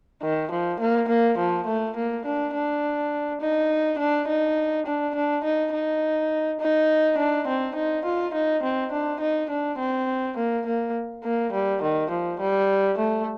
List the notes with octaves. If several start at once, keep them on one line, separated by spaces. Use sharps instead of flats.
D#3
F3
A#3
A#3
F3
A3
A#3
D4
D4
D#4
D4
D#4
D4
D4
D#4
D#4
D#4
D4
C4
D#4
F4
D#4
C4
D4
D#4
D4
C4
A#3
A#3
A#3
G3
D#3
F3
G3
A3